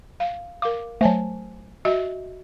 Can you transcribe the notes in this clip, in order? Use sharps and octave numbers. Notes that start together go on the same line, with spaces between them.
F5
A#4 F5 D6
F#3 A3 C5 G#5 A5
F#4 D#5 E5